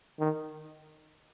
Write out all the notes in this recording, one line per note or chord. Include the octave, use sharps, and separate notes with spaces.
D#3